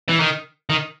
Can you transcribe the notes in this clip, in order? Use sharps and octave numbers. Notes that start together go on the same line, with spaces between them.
E3
D#3
D#3